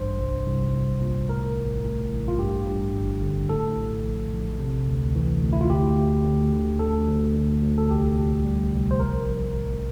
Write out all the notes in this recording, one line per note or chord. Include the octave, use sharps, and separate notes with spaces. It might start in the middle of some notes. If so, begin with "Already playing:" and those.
Already playing: A1 G2 C5
C2
C2
C2
A#2
A2 A#4
A1
A2
A1
F4
G2 G4
G2
G1
D3
A2 A4
A#1
A#1
A#1
C3
D2
E3
D2
E4
F4
D2 G4
D2
D2
D3
D2 A4
D2
D2
D2
A4
C2 G4
A#2
G3
C2
C5
A#1 A#4
A#1
A2